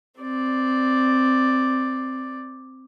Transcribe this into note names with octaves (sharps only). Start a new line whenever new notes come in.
C4 D5